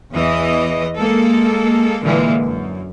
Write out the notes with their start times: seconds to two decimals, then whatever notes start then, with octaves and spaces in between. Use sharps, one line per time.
0.14 E2 E3 D#5
0.97 G#3 A#3 A4
2.03 A#2 D3 E3 G#3 A#3
2.44 F#2